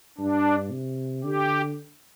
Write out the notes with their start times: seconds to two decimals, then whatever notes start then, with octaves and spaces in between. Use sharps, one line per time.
0.18 G2 D4
0.71 C3
1.24 D3 G4